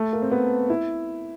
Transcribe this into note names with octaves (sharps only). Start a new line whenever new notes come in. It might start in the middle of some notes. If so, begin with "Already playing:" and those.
Already playing: A3
A#3
C4
B3
E4